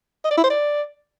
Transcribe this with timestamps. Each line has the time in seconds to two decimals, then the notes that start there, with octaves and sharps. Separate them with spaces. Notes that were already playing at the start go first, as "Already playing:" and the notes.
0.25 D#5
0.31 D5
0.37 E4
0.44 C5
0.50 D5